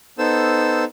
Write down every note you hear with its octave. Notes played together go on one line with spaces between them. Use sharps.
B3 D#4 A4 C5 E6